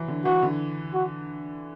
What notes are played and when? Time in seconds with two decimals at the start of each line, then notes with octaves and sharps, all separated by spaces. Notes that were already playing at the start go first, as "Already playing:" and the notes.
Already playing: E3 F#3
0.08 D3
0.25 E3 F#4
0.42 D3
0.94 F#4